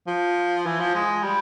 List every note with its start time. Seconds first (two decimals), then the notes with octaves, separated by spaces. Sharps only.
0.07 F3
0.66 E3
0.80 F3
0.94 G#3
1.24 G3